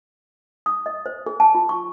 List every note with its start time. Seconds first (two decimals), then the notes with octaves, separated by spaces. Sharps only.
0.66 D#6
0.86 D#5
1.06 C5
1.26 G#4
1.40 A5
1.55 F4
1.69 C#6